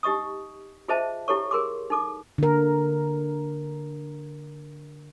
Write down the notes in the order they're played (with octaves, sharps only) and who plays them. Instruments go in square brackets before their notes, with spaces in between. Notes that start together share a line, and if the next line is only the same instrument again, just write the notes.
[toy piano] D#4 G4 D#5 C#6 D#6
F4 G#4 C5 D#5 E5 A5
E4 G4 A4 C#5 C#6
G#4 A#4 C6 D6
D#4 A4 D6
[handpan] D3 A#4